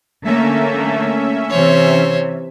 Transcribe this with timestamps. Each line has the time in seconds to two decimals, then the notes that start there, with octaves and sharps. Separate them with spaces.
0.24 D3 A3 A#3 C#4 E5
1.50 C3 E3 C5 C#5